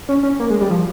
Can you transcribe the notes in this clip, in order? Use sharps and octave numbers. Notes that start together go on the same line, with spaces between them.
C#4
C#4
A#3
G#3
G3
F3